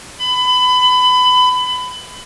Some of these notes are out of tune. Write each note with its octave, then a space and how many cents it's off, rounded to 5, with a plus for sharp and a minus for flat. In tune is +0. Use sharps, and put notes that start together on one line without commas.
B5 +25